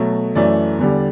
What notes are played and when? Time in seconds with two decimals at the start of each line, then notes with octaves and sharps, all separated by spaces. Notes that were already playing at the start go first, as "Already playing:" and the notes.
Already playing: B2 F#3 A3
0.35 F#2 E3 A3 D5
0.78 E2 D3 G3